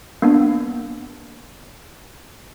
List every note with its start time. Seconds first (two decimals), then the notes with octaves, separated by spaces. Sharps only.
0.22 A#3 B3 D4